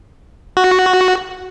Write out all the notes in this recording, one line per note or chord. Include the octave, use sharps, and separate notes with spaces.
F#4